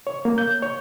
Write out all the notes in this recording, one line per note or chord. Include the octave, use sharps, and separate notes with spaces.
C#5
A#3
G6
C#5